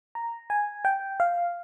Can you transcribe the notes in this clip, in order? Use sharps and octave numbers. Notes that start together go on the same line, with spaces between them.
A#5
G#5
G5
F5